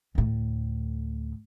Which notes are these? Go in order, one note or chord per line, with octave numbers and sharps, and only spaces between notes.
D2 A2